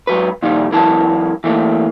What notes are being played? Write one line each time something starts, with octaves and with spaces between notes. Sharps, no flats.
G#2 F#3 B4
A#2 D#3 F3 G3
C#2 F#2 E3 A#4 A5
E3 A3 A#3